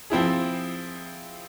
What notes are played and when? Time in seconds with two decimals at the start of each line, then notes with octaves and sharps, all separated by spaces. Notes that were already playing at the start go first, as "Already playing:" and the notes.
0.10 F3 C4 E4 G#4